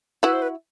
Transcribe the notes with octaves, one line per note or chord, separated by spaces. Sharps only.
E4 F#4 B4
C5
B4